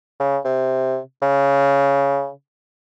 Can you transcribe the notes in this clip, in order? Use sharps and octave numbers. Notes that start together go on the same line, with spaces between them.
C#3
C3
C#3